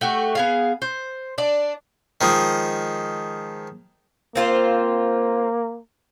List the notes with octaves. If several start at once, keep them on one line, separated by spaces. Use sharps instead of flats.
A3 F#4 G4
B3 G#4 F5
C5
D4 D5
D#3 F3 G#3
A#3 C4 F4 C5